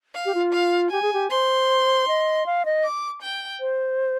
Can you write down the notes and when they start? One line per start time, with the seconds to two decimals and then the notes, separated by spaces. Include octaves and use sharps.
0.14 F5
0.26 G4
0.35 F4
0.53 F5
0.91 G4 G#5
1.02 G#4
1.13 G4
1.30 C5 C6
2.08 D#5
2.46 F5
2.65 D#5
2.84 D6
3.22 G5
3.60 C5